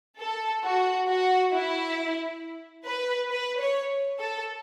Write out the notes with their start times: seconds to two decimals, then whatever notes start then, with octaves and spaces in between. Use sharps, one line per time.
0.19 A4
0.64 F#4
1.08 F#4
1.53 E4
2.86 B4
3.30 B4
3.60 C#5
4.19 A4